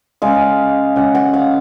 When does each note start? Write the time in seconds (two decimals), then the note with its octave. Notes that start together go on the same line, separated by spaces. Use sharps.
0.22 C#3 G#3 F5
0.96 C#3 G#3 F#5
1.15 F#5
1.34 F5